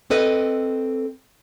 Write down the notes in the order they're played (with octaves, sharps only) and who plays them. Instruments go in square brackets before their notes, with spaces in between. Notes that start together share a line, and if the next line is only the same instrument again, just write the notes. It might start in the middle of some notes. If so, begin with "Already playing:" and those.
[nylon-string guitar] C4 A4 B4 D#5